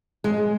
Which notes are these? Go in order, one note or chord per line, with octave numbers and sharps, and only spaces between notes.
G#3